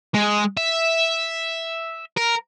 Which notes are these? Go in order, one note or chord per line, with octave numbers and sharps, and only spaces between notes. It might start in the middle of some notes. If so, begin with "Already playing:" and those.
G#3
E5
A#4